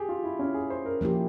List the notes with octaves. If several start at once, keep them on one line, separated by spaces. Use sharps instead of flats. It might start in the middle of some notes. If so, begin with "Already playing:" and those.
Already playing: G4 G#4
F4
E4
C#4
G#4
C5
A#4
F3 A#3 E4 G4